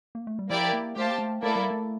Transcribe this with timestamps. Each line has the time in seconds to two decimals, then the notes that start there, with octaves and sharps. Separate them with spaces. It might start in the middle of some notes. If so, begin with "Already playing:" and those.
0.15 A#3
0.27 A3
0.39 G3
0.49 F3 A#3 E4 G4 D5
0.73 A#3
0.96 A3 G4 C5 F5 A5
1.07 A#3
1.18 A3
1.42 A3 A#3 E4 A4 D5
1.56 G3
1.71 A3